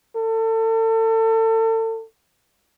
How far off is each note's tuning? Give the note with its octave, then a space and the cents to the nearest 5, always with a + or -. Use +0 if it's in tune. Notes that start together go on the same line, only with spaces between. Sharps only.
A4 +35